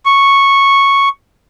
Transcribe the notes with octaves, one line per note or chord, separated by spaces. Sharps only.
C#6